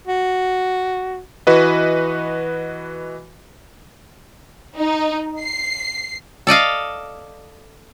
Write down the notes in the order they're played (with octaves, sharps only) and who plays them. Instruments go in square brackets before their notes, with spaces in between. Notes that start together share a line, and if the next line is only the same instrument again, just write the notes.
[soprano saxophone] F#4
[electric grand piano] E3 F#4 B4 D#5
[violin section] D#4
C7
[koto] A4 D5 D#5 F5